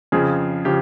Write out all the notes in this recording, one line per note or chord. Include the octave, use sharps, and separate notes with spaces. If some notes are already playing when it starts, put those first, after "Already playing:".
F2 C#3 F3 G#4
C#3 F3 G4